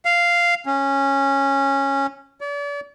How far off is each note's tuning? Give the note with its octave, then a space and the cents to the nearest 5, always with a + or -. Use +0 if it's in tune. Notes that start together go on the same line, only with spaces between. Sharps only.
F5 -5
C#4 -10
D5 -40